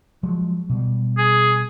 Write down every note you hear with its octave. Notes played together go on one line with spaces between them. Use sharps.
F3 F#3 G#3
B2 G3
G#4